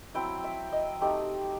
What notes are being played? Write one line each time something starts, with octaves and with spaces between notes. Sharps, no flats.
F#3 C4 E4 G5
E5
D#5
A3 C4 D#4 G4